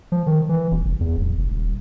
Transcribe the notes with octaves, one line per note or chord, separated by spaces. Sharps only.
F3
D#3
E3
D#1
F1
E2
D1
F1
D#1